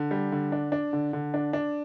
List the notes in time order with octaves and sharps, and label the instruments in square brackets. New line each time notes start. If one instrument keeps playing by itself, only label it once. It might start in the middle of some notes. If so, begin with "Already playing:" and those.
Already playing: [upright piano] D3
G3
D3
D4
D4
D3
D3
D4
D4